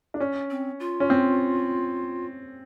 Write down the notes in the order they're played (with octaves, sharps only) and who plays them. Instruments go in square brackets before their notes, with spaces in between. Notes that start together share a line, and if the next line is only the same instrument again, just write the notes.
[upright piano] D4
C#4
[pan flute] C4
F4
[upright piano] C#4
C4